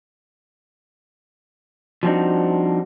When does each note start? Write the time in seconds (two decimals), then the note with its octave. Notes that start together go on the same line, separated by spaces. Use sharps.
2.03 F3 G3 C4 D4 D#4 F#4